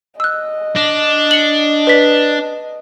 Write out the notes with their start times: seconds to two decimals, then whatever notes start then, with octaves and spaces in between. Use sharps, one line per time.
0.20 D#5 E6 F#6
0.76 D4 A#6
1.31 C#7 F#7
1.87 B4 D5 B6